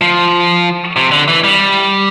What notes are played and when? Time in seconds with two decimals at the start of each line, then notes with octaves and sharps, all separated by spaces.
0.01 F3
0.96 C3
1.11 D3
1.28 E3
1.44 G3